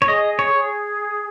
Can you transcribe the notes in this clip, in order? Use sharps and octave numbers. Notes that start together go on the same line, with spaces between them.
C#5
G#4 D#5
C#5
G#4